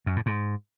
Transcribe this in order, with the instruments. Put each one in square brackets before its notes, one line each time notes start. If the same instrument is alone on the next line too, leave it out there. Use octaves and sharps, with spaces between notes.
[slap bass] F#2
A2
G#2